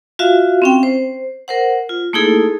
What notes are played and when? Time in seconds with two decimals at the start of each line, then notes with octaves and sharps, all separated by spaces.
0.19 F4 F#4 E5 F5
0.62 C4 C#4 G5
0.83 C5
1.48 A#4 C5 F#5
1.89 F4
2.13 A3 A#3 D#4 E4 G#4 A4